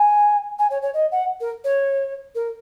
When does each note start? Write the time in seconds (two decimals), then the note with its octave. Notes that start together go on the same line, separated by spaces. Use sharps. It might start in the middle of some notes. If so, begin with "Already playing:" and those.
Already playing: G#5
0.59 G#5
0.70 C#5
0.82 C#5
0.94 D#5
1.12 F#5
1.40 A#4
1.64 C#5
2.35 A#4